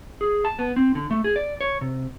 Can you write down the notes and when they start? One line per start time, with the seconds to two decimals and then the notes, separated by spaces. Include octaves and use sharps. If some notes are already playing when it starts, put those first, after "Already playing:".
0.21 G#4
0.45 A5
0.59 B3
0.76 C4
0.95 D3
1.11 A3
1.24 G#4
1.36 D5
1.61 C#5
1.81 C3